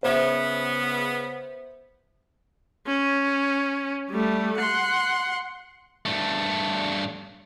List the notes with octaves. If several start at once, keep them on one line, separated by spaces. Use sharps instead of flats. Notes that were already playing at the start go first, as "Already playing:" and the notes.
C#3 B3 C5 E5
C#4
G3 A3
F#5 C6
G2 A3